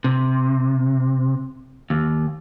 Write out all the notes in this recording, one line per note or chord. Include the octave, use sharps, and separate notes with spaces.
C3
D#2